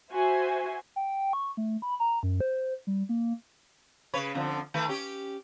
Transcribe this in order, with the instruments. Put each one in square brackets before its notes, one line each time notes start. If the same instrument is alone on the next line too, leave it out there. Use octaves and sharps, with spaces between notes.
[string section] F#4 C5 E5 G#5
[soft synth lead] G5
C#6
A3
B5
A#5
F#2
C5
G3
A#3
[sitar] C#3 B4 C#5
F2 D3 F3
D#3 A3 B4
C#4 G4